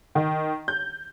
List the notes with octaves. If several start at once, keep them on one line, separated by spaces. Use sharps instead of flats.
D#3
G6